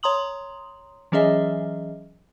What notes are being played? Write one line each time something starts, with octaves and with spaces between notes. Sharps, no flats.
C#5 A#5 C6 D#6 F#7
E3 F#3 C#4 G#4 D#5 E5